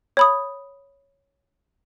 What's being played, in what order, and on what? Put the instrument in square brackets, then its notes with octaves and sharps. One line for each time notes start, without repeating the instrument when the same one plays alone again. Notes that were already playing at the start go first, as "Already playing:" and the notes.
[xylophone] C#5 B5 D#6